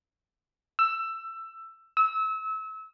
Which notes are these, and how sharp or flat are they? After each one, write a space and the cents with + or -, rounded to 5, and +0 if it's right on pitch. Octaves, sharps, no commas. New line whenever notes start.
E6 +15
E6 -30